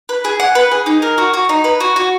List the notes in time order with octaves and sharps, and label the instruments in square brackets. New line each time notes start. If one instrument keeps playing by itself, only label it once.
[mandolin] B4
G#4
F#5
B4
G#4
D#4
A#4
F#4
F#4
D#4
B4
F#4
F#4